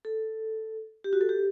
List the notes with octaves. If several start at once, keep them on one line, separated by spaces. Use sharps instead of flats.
A4
G4
F#4
A4
G4